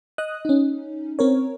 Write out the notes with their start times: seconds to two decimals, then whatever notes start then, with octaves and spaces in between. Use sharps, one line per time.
0.18 D#5 D#6 F#6
0.45 C#4 D#4
1.19 C4 A#4 C#5